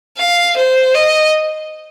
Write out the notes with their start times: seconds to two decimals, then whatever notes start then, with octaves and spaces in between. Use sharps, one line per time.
0.17 F5
0.56 C5
0.94 D#5